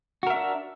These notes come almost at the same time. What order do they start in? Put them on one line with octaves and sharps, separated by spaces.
F#4 A#4 E5 D4